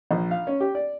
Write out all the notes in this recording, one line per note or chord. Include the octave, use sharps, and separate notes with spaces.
A#1
F5
C#4
G4
D5